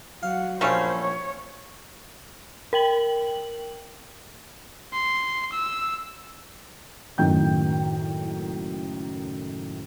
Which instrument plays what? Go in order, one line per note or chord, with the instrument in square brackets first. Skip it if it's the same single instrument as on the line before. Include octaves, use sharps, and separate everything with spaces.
[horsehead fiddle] F#3 F#5 [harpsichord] F5
[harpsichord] A#1 F5 [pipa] G3 A3 C#4 [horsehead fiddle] C5
[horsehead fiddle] C#5
[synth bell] A#4 G5 F#7
[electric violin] C6
E6
[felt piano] F#1 F#2 A2 D#3 G5 G6